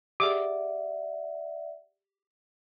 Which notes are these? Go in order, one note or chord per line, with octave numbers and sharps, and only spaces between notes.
G4 G#4 D5 E5 F#5 D6